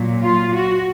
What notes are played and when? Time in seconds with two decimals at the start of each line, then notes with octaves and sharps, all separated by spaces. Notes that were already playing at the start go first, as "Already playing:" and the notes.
Already playing: A#2 F#3
0.23 F4
0.53 F#4